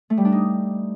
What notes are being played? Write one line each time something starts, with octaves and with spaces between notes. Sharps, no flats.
A3
G3
D4
D#4